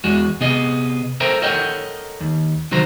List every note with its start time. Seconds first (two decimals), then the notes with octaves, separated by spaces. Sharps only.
0.04 E2 G#3 F#4
0.40 C3 B3 G#4 D#5
1.20 A4 A#4 C5 E5 G5 A#5
1.42 A4 A#4 C#5 D#5 F#5 G5
2.20 D#2
2.71 C2 D3 D#3 F#3 C5 A#5